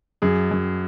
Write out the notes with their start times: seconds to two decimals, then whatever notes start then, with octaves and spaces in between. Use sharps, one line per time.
0.22 F#2 G#4
0.51 F#2